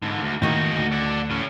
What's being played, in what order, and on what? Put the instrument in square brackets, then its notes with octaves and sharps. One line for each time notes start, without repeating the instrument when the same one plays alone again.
[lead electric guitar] G#2 D3
D2
[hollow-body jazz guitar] A2 D#3 A#3 [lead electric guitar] D#4 F#4
[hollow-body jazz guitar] D2
[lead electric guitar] D5 F#5
A2 C#4